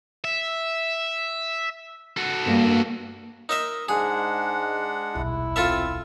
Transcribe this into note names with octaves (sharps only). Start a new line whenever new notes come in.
E5
F#4 A4
G2 A#3
D#4 A#4 D#5 E5
G#2 G#3 D4 G#4 F#5
D#1 B1 E4
C4 F4 A4 E5